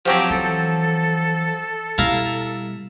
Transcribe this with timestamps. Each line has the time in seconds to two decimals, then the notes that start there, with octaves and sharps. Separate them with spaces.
0.06 F3 F#3 C4 G4
0.30 E3 A4
1.98 B2 G3 E4 F5 A#5